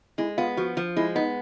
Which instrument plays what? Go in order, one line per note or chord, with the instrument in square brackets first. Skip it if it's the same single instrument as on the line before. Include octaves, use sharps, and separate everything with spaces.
[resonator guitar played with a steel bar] G#3 [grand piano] E4
[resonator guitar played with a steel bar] B3 [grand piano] F4
[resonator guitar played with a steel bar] F3 [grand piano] F#4
[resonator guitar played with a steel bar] F3 [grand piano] F4
[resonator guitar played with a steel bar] G#3 [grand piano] E4
[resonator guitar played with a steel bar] B3 [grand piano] D#4